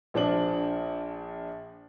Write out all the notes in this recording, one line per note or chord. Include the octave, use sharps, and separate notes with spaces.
A#1 F3 D4 F#7